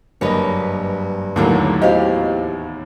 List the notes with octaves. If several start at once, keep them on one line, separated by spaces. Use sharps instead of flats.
F#1 G2 A#3 B4 C#5 D#5
D#2 A2 D3 F#3 A#3 B4
E2 F#4 G4 C5 D#5 F5